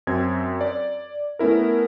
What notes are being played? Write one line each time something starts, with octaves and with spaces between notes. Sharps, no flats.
F#2 C4 G#6
D5
A3 B3 C#4 E4 A#4